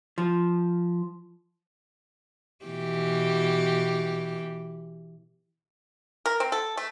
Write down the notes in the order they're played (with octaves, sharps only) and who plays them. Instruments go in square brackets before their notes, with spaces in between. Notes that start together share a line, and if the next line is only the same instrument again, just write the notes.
[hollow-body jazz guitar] F3
[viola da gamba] B2 E3 G4
[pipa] A#4
C4
A4
A3